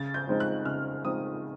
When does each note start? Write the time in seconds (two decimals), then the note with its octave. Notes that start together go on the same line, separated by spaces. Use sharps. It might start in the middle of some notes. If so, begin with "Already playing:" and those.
Already playing: C#3 A6
0.14 G6
0.27 F3 G#3 C4 D#4
0.40 F#6
0.65 C#3 F6
1.05 F3 G#3 C4 D#4 D#6